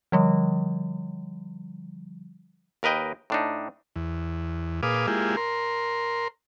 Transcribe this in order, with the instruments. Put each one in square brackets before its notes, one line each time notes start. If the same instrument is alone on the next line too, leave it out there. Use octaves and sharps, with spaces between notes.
[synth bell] D3 F3 G3
[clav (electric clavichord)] D#2 A#4 B4 D#5 G5
A2 D4 D#4
[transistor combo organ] E2
A#2 G#4 B4 F5 D6 D#6
G#3 A#3 E4 F4 G4 G#4
A#4 C6